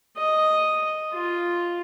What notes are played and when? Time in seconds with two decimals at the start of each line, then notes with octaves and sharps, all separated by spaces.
0.17 D#5
1.13 F4